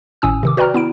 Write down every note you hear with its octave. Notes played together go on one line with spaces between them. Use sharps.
G#1 A2 C#4 G#5 D#6 E6
C3 D#3 D6
F#4 B4 D5 G5 A#5 F6
B3 E4 D7